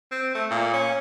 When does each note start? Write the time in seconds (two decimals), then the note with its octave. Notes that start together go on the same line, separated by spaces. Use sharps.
0.11 C4
0.35 A3
0.50 A#2
0.73 C#4